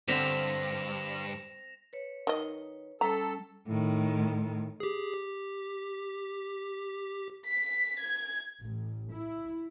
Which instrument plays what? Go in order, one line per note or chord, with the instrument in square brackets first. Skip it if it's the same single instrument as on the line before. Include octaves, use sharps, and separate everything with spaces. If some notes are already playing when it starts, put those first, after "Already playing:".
[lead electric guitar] G2 [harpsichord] D3 B5 [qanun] C4 [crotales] A#6 E7 F7
[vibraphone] B4 C#5
[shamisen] D#3 D#5
[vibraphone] G3 C#4 [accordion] A4 [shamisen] A#5
[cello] A2 D#3
[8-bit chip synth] G4 G#4
G4
[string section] B6
G#6
A1
E4